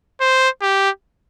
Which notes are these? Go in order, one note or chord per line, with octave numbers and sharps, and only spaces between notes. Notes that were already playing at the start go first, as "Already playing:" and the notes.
C5
G4